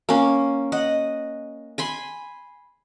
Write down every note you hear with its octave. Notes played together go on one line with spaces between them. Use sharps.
A#3 C#4
D#5 F#5
G#5 B5 C6